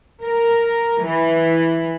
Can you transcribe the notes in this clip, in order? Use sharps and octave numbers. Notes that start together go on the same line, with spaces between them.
A#4
E3